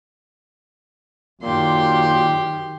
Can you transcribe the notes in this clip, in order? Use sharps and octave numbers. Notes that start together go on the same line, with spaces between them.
F#2 A#2 D#3 G4 C6